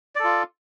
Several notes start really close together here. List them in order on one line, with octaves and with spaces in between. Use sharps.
D5 A4 F4